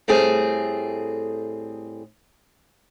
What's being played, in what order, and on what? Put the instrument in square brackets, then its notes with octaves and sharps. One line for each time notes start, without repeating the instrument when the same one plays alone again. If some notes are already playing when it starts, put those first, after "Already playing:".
[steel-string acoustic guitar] A2 G3 A3 C4 G#4